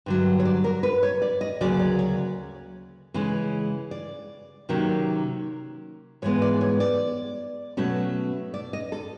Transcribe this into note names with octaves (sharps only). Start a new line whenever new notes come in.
G2 D3 F#3
C#5
D5
A#4
B4
C#5
D5
D#5
D2 C#3 F#3 A#3 C#4 D5
D5
C#5
C#3 E3 G#3 C#4
D5
C3 D#3 F#3 A#3 C#4
G#2 E3 G#3 B3 C#5
D5
C#5
D5
B2 F#3 A3 C#4
D5
D#5
A4